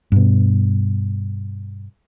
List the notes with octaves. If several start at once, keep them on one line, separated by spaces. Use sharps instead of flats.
G2 B2